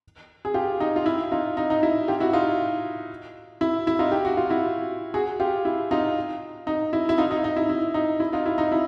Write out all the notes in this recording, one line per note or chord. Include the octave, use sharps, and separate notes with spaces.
G#4
F4 G4
D#4
F4
E4
D#4 F4
D#4
D#4
E4
F4 G4
E4 F#4
D#4 F4
E4
E4
D#4 F4
G4
F#4
F4
E4 F#4
F#4 G#4
F4 G4
E4
D#4 F4
D#4
E4
E4
D#4 F4
D#4
D#4
E4
E4
D#4
E4
D#4 F4
E4
D#4
E4